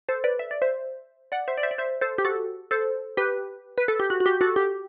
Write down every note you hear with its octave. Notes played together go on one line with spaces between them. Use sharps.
A4 C5
B4 D5
E5
D5
C5 E5
D5 F#5
C5 E5
D5
C5 E5
D5
C5 E5
A4 C5
G4
F#4 A4
A4 C5
G4 B4
B4
A4
G4
F#4
F#4
G4
F#4 A4
G4